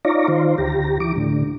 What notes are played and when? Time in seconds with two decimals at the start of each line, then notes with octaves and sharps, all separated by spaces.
0.05 D#4 F4 C#5 D5 A#5
0.28 D#3 F4 C5
0.58 D2 G4 A#5
1.00 E3 D6
1.16 A2 D3